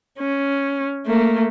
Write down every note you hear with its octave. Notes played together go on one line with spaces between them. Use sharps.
C#4
A3 A#3